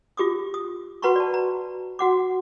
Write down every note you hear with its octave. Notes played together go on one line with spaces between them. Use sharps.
F4 G4 D6 D#6
D#6
F#4 B4 F#5 A#5 B5 C#6
D5 A5
A#5
F#4 F#5 D6